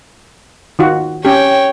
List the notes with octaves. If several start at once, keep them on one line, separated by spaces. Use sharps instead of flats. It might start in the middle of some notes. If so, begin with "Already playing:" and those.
D#3 F4 F#4
C#4 G4 C#5 G5